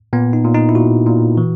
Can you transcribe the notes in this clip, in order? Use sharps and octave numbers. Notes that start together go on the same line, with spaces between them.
A#2 B3
D#4
A#2
D#4
E4
A#2 F#4
A#2
E3